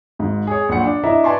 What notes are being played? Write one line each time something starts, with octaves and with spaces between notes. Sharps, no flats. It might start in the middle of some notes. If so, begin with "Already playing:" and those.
G#1 G#2
G#4 C#5
A#1 A#2 F#3 F#5 C#7
D4
D4 E4 D#5 E5 A#5
B4 D5 G#5 A5 C6 C#6